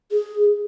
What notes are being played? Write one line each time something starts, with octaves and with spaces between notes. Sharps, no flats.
G#4